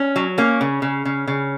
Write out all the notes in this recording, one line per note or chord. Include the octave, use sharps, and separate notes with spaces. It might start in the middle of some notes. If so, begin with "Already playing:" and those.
Already playing: C#4
F#3
A#3 C#4
C#3
C#3
C#3
C#3